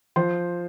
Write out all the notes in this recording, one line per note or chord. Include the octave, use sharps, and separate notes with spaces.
F3 C5